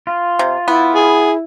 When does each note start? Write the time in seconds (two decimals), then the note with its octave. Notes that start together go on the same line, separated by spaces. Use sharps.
0.07 F4
0.39 C3
0.68 B3 E4
0.95 G#4